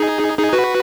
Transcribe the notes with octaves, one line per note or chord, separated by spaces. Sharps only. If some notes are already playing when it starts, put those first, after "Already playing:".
Already playing: D#4 G#4
D#4 G#4
F#4 B4